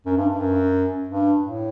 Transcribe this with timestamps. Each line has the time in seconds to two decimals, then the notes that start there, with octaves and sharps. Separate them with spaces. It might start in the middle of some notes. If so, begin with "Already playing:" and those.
0.05 F#2
0.17 G2
0.29 G2
0.40 F#2
1.08 G2
1.43 A2